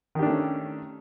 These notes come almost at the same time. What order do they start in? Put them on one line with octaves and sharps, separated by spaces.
D#3 G4 D4 A3 C#4